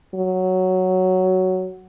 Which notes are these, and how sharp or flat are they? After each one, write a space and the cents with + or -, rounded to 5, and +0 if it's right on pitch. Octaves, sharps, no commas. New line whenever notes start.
F#3 +5